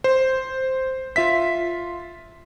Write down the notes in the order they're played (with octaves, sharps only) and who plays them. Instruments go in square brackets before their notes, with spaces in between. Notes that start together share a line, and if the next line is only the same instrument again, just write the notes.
[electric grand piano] C5
F4 E5 B6